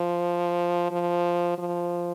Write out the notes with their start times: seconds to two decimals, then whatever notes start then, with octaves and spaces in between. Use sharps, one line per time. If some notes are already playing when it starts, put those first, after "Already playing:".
Already playing: F3
0.92 F3
1.58 F3